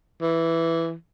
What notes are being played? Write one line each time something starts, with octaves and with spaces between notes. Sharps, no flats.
E3